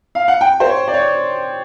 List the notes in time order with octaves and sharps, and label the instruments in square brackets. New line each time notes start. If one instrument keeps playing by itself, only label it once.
[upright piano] F5
F#5
G5
C5
C#5
D5
C#5